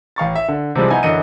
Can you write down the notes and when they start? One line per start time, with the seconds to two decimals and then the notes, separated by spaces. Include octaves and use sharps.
0.16 A1 F5 C#6 A6
0.35 E5
0.48 D3
0.75 C3 E3 F3 G3 G#3
0.90 B3 D#4 E4 G#5
1.03 F#2 D3 E3 D#5 C#7 D#7